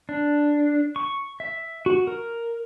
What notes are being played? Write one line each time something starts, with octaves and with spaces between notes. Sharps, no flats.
D4
C#6
E5
F#4
A#4